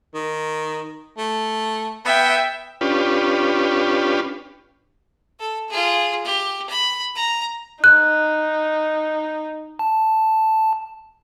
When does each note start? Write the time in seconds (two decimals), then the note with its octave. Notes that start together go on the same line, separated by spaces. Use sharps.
0.14 D#3
1.17 A3
2.05 B3 E5 G5
2.81 C#4 D4 F4 G4 B4
5.40 A4
5.70 F4 G#4
6.25 G4
6.69 B5
7.15 A#5
7.84 D#4 F#6
9.79 A5